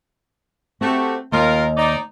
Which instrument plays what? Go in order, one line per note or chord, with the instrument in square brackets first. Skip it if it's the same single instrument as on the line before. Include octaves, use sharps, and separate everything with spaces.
[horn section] A3 F#4 G4 [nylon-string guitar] C4
[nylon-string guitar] D#2 [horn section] F4 A#4
[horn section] D#4 D5